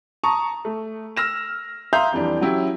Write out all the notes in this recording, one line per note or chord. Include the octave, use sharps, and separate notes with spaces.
A5 A#5 C#6 D#6
A3
E6 F6 A#6 E7
E5 F5 A#5 C6 D#6 G6
F2 E3 G3 D4
F#3 C#4 E4 G4